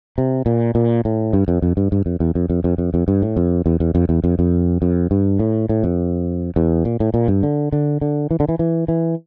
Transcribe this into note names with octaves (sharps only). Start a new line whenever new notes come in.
C3
A#2
A#2
A2
G2
F2
F2
G2
G2
F2
E2
F2
F2
F2
F2
F2
G2
A2
F2
E2
E2
F2
E2
F2
F2
F2
G2
A2
A2
F2
E2
A#2
A2
A#2
G2
D3
D3
D3
E3
D3
E3
E3
E3